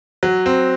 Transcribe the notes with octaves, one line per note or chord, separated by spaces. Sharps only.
F#3
C4